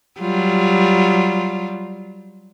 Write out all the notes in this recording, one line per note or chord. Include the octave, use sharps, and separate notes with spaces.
F#3 G3 F4